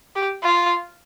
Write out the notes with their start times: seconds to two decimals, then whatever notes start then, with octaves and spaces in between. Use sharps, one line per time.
0.16 G4
0.43 F4